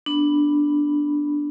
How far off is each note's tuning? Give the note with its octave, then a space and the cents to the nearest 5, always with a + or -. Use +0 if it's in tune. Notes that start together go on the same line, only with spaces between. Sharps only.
B3 +0 D4 +0 B5 +0